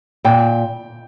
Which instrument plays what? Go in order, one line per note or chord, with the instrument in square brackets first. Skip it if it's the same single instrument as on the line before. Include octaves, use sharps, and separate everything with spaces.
[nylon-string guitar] A#2 [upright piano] G5